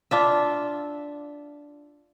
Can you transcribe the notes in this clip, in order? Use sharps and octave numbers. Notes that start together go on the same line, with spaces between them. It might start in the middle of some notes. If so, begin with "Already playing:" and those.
D4 F4 E5